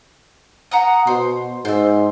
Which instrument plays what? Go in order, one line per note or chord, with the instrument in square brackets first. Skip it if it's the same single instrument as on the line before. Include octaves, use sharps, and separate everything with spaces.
[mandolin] F#5 A#5 D#6
[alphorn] B2 [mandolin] C5
[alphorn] G#2 [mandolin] C5 E6